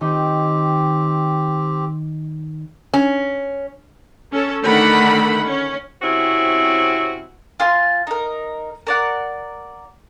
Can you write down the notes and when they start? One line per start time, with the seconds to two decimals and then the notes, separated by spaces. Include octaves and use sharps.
0.01 D#3 C4 D#4 G4
2.94 C#4
4.32 C#4 A4
4.63 D3 D#3 A3 F#5 B5
5.46 C#4
6.02 C3 C4 C#4 E4 F#4
7.60 F4 G#5 C6 F6
8.07 D#4 A#4
8.87 A#4 D5 F#5